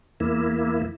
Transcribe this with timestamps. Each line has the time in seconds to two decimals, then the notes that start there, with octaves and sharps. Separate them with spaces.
0.20 E2 A#3 E4